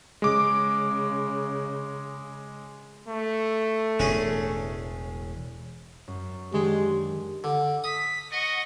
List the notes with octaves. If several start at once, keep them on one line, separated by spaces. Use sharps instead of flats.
C#3 G#3 D6
A3
E1 A2 G#3 C#4 G#4
F#2
D#3 G#3 D4 G4
D3
D#6 B6
D#5 F#5 C#6